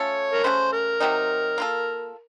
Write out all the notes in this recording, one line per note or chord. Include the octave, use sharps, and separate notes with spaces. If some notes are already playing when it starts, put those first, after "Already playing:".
Already playing: A3 C#4 F4 A4 C#5
A#4
C#3 A3 C#4 F#4 C5
A#4
C3 F#3 C4 D#4
A#3 F4 A4